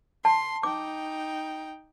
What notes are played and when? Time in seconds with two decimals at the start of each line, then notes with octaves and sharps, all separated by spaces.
0.25 A5 C6
0.63 D#4 G5 D6